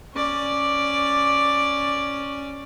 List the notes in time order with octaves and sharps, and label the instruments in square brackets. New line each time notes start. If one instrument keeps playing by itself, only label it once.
[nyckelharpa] C#4 D5